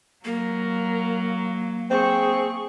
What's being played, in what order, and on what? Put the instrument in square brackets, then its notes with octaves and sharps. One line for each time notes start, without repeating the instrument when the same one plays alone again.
[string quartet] F#3 [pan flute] A#3 [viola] A#4
[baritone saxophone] C4 [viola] G#4 C#6